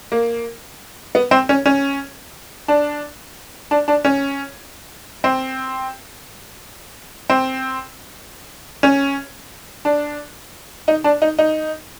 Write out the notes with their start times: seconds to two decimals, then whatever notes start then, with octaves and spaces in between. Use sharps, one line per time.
0.12 A#3
1.15 B3
1.31 C4
1.49 C#4
1.66 C#4
2.68 D4
3.71 D4
3.88 D4
4.05 C#4
5.24 C4
7.30 C4
8.83 C#4
9.85 D4
10.88 D#4
11.04 D4
11.22 D#4
11.39 D#4